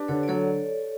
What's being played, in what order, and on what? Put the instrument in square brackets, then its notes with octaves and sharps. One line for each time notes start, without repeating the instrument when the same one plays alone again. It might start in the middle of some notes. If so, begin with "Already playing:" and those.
Already playing: [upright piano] D4 [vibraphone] G4 B4
[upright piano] D3 [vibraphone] A4 C#5
[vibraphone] D5
[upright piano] F#3 [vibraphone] A4 C#5